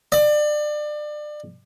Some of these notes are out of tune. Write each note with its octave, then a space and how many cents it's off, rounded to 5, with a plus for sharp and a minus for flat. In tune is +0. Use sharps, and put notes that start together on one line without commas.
D5 +30